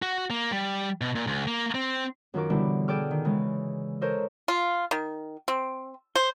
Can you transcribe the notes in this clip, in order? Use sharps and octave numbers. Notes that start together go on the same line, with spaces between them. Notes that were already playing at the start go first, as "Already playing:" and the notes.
F#4
A#3
G3
B2
A#2
C#2
A#3
C4
F#2 D#3 F4 F#4 A#4 D6
B2 D3 E3 G3 D4 E4
G#4 A4 D5 G5 D6 F6
D#3
C#3 E3 G#3
A4 A#4 C5 C#5 D#5
F4
D#3
C4
C5